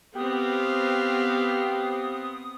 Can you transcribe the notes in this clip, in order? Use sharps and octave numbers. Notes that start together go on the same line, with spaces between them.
B3 C4 G4 F5 D#6